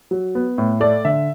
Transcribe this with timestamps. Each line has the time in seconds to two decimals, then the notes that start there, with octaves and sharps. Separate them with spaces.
0.11 F#3
0.35 B3
0.58 A2
0.80 A3 D5
1.05 D3 E5